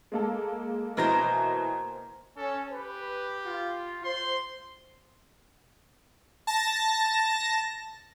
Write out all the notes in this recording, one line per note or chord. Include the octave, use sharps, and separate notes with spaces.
G#3 A#3 A4
B2 E3 A#3 A#4 C5 D#5
C#4 A4
G4 B4
F4
C5 C6
A5 A#6